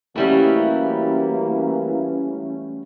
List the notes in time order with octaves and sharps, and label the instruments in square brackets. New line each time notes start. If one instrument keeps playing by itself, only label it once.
[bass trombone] E3 [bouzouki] F#3 G3 E4 [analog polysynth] A3 C#4 [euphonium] A#3